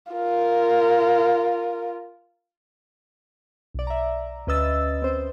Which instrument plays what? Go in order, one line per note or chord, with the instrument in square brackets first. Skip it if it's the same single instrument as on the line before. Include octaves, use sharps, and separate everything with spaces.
[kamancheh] F4 A#4
[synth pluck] B1 D5
E5 A#5
D2 C#4 B4 D#5 E6 A6
C4 C5